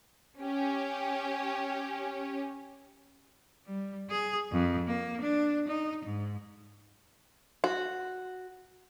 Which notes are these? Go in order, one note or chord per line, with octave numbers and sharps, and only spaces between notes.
C#4 G4
G3
G#4
F2
A#3
D4
D#4
G#2
F#4